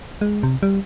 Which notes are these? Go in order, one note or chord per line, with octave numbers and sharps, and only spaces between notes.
G#3
C3
G3